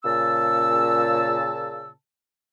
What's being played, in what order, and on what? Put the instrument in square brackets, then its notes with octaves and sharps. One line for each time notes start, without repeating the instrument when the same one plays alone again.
[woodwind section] A#2 C#3 A5 E6